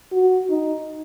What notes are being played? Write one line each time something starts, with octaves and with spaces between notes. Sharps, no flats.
F#4
D#4